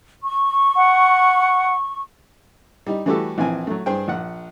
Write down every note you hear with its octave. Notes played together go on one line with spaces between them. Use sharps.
C#6
F#5
G3 D#4
E3 G3 A3 F#4 G4 A4
A#1 E3 C4 G#5
F#3 A3
G2 G#4 C5 G5
A#1 F#5